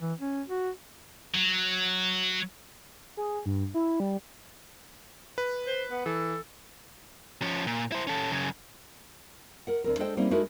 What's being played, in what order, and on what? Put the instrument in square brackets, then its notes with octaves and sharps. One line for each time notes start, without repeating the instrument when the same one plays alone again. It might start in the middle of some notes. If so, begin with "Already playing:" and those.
[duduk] E3
C#4
F#4
[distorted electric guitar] F#3
[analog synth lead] G#4
G2
E4
G3
[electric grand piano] B4
[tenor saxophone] C5
B3
[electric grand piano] E3 [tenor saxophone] A4
[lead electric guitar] F3 C#4
A#2
E4 C5
C#4 A4
F#2 C#3
[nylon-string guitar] A#4 F#5
D2 C4 A#4
G#3 D4 A4 C5 D#5 G5
G3 A#3 C4 C#4 D#4 E4
G#3 A3 D#4 E4 F#4 A#4